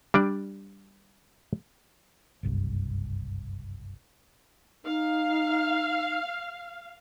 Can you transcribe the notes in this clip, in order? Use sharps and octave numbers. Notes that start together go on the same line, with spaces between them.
G3 D4 D5
F#1 C2 G2
D#4 F5